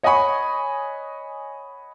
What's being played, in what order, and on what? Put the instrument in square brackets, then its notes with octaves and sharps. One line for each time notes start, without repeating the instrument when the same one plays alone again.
[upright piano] C#5 D#5 F#5 G#5 B5 C#6